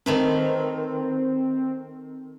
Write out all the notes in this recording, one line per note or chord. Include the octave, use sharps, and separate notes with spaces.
D#3 A3 C4 B4